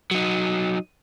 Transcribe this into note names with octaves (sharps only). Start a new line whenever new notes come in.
F#3 D#4